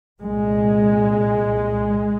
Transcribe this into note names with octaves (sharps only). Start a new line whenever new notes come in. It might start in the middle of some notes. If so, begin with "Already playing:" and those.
C2 A#2 G#3